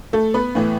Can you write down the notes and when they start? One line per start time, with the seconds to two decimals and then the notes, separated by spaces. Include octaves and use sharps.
0.13 A3 A4
0.34 B3 B4
0.55 A2 E3 A3